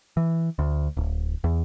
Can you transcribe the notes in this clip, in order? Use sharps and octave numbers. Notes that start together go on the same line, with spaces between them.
E3
D2
D1
E2